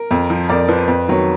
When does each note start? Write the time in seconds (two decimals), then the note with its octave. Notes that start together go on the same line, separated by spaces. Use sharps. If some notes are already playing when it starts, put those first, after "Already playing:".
Already playing: A#4
0.11 F2
0.30 F3
0.49 F2 A#4 D5
0.68 F3 B4
0.88 F2 B4
1.08 D#3 F#3